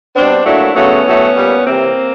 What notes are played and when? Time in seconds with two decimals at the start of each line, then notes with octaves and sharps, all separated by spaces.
0.15 B2 G3 C4 D4
0.45 A#2 F#3 A3 D4 E4
0.75 C#3 F#3 A3 B3 C#4
1.05 A2 F#3 A3
1.35 A#2 G3
1.65 C3 E3 G3 A#3 C4